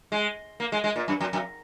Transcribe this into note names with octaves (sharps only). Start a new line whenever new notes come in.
G#3
A#3
G#3
G#3
A#2
F#2
F2
F2